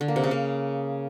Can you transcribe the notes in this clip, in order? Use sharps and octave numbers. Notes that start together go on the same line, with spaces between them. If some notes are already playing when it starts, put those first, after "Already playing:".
D3
A#3
C3
C#3
A#3